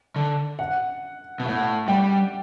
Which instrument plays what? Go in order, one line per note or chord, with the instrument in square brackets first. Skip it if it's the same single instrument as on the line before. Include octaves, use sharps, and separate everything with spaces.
[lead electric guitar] D3
[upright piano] F#5
[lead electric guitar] B2
[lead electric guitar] A2 [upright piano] F#5
[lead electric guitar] G3 [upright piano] G5